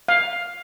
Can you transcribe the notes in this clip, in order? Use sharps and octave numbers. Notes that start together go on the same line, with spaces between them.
F5